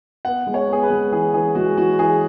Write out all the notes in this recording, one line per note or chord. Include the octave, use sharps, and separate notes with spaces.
B3 F#5
G#3
C#5
B3 G#4
B4
G#3
E3 G#4
E3 G#4
G#3 F#4
E3 F#4
E3 G#4